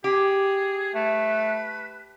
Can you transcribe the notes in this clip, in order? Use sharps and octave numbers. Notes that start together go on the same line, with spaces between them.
G4 G#4
A3 B4